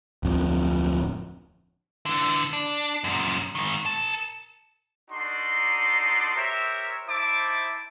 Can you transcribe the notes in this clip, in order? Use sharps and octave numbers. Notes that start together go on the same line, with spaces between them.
D1 F2
D3 E3
D4
F#2 A#2
G#2 D#3
A#4 A5
D4 D#4 F#4 A4 D5 C6
G4 A#4 C5 C#5 E5
D#4 E4 C5 E5 A5 D6